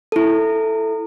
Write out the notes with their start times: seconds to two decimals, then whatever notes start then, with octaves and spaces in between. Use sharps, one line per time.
0.12 E4 A4